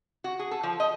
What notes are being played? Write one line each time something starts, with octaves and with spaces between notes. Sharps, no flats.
F#4
G#4
A4
F3
D#5